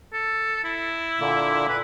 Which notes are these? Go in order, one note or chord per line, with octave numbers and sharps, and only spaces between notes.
A4
E4
A#2 D3 A#3
B4